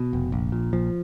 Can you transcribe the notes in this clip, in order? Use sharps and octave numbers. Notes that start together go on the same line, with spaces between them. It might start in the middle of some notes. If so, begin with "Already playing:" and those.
Already playing: B2
F1
A#1
A#2
A#1 F3